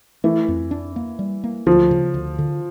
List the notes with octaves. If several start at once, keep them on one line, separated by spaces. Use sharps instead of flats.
E3 A3
F2
D4
A#3
G3
A#3
D2 F3
C#3
D2
D3